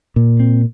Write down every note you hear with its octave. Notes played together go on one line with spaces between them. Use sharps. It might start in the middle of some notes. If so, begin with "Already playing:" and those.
A#2
C4